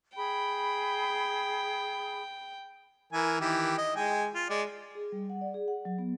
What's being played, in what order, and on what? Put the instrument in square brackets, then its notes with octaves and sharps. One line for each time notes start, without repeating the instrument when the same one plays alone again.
[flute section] G#4 B5 [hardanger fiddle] G5
[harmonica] E3 A#4 G#5
D#3 E3 G4
D#5
G#3 G5 G#5
F4
G#3 D5
[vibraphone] G#4
G3
F#5
D5
G#4
F#5
F#3
B3